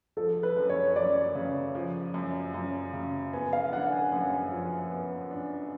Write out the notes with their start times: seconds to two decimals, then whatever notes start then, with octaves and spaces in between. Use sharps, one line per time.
0.17 F3 A4
0.43 B4
0.57 F#2
0.69 C#5
0.96 F#2 D5
1.35 C#3
1.75 F3
2.14 F#2
2.54 F#2
2.93 C#3
3.33 B3 G#5
3.53 F5
3.72 D4 F#5
3.92 G#5
4.12 F#2 G#5
4.52 F3
4.91 B3
5.31 D4